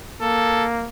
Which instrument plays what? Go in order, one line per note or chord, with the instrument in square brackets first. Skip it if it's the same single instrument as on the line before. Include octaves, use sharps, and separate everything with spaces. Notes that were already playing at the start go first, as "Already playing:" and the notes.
[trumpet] A#3 [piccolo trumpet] A4